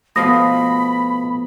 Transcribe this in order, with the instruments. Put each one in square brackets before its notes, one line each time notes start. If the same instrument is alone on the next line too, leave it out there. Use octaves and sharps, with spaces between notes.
[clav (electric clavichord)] B2 F3 F5 [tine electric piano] A3 B3 [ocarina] B5 [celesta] D#6 A#6